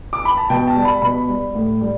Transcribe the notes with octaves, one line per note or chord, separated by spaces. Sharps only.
D6
B5
A5
B2 G5
A5
G3
B5
B2 B5
G3
A2
G3